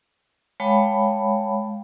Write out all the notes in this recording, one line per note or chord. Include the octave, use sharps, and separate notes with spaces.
G#3 C#5 F5 G5 A5 B5